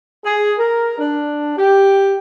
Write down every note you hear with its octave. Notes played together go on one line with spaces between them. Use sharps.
G#4
A#4
D4
G4